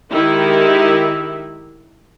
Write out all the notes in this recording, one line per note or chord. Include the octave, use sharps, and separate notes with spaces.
D#3 G#3 D#4 E4 G4 E5